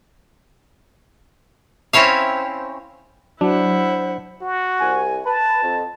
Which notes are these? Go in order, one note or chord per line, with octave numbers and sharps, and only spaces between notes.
C4 C#4 E4 C#5 F5
F#3 D4 E4 C5 F#5
F#4
C2 G#5
B4 A5
F2